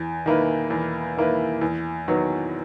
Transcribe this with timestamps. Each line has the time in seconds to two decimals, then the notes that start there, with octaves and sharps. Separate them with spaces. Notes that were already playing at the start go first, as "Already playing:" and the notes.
Already playing: E2
0.26 D#3 A#3 E4 B4
0.70 E2
1.17 D#3 A#3 E4 B4
1.61 E2
2.08 D#3 F#3 B3